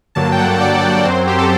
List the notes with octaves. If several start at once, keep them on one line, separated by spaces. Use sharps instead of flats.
G2 D3 F#3 A#3 A5
G5
F#5
D5
D5
F#2 F#3 C4 C5
G4
A4